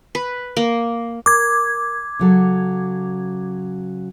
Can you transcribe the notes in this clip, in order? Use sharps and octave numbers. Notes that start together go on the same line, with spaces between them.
B4
A#3
A#4 D6 G#6
C#3 F#3 A4